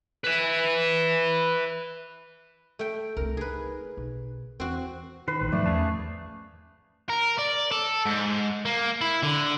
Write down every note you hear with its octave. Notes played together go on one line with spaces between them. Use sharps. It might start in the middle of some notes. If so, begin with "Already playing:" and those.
B4 E5
A3 G5
C2 A3 A#4
D#4 G#4 B4
B1
E2 C4 F#4
D#3 B4 C5
A1
G#2 F3 F#3 A3 D5
E2 C#4 G#4 F5 A5
A#4
D5
A4
G#2
A#3
E4
D3